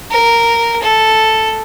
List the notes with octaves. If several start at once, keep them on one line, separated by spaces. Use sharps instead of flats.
A#4
A4